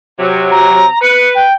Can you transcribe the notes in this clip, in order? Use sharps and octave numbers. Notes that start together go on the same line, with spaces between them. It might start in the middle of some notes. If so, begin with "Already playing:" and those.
C3 F#3
A#5
B4 C#7
G5